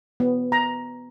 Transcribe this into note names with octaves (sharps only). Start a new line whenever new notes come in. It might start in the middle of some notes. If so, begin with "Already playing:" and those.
B3
A#5